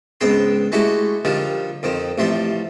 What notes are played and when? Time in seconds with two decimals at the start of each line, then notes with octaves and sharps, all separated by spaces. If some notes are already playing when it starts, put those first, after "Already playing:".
0.21 C#2 G#2 B3 C4 G5 C6
0.72 G#3 A3 E4 F#4 G4
1.25 D3 D#3 F3 G3
1.83 F2 D#3 C4
2.18 A1 C3 F3 A3 C4 C6